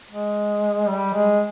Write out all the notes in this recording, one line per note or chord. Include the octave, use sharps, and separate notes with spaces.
G#3
G3
G#3